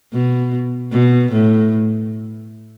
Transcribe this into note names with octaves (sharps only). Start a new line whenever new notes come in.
B2
B2
A2